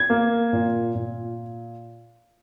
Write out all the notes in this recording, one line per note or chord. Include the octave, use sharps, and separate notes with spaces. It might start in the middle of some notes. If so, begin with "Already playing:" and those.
Already playing: G#6
A#3
A#2
A#2